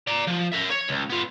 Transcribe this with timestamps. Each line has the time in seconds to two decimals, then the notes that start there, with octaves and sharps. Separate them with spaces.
0.07 D5 A#5
0.27 F3
0.52 A#4 E5
0.70 C#5
0.89 C#2
1.10 B3 F4